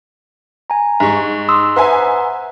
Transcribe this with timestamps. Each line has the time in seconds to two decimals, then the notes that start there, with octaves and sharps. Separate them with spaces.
0.70 G#5 A#5
1.00 G#2 G3 C#6
1.49 C6 D#6 E6
1.76 B4 C5 E5 F#5 G#5 A#5